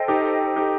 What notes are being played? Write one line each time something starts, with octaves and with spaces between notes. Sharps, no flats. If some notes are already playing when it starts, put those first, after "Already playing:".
Already playing: A4 C5 D#5 G5
D#4 G4
D#4 G4